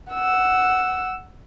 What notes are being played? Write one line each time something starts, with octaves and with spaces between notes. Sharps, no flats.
F#5 E6